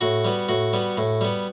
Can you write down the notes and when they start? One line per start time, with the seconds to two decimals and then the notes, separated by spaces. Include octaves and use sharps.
0.01 A2 F#4
0.25 G3 B3
0.49 A2 F#4
0.73 G3 B3
0.97 A2
1.21 G3 B3